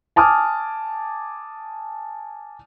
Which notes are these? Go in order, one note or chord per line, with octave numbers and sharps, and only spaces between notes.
G#5 A5 D6 D#6 F6